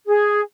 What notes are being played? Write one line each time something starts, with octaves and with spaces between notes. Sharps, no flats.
G#4